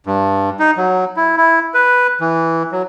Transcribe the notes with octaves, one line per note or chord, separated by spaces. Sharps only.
G2
D#4
F#3
E4
E4
B4
E3
F#3